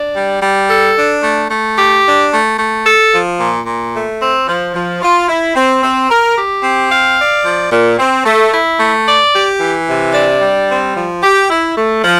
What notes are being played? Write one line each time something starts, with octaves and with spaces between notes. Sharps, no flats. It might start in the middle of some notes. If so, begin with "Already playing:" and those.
Already playing: D4
G3
G3
A4
D4
A3
A3
G4
D4
A3
A3
A4
F3
A#2
A#2
A3
C4
F3
F3
F4
E4
C4
C4
A#4
G4
C4
F5
D5
F3
A#2
C4
A3
E4
A3
D5
G4
E3
C3
D4
G3
C4
F3
G4
E4
A3
F3